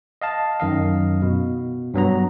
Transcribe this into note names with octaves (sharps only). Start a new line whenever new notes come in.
D#5 F5 A5
F#2 D#3 D#5 F5
B2
G2 F#3 B3 A#5